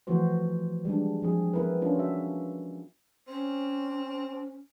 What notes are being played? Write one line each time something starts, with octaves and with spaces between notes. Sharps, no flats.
E3 F3 A3 B3 F#4 C5
G3 G#3 D4
F3 C4 G#4
B3 C4 E4 A#4 B4
C#4 D4 F4
F#4 E5
C4 C#4